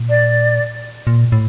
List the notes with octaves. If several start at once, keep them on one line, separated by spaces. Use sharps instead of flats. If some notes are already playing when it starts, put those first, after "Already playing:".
Already playing: A#2
D5
A#2
A2